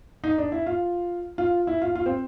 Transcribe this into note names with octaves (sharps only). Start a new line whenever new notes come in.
D#4
D4
E4
F4
F4
E4
F4
F4
C4